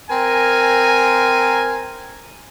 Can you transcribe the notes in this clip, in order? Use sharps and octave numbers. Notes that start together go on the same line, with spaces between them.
C4 A#4 G#5